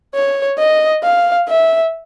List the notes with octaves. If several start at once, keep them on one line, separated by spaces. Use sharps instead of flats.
C#5
D#5
F5
E5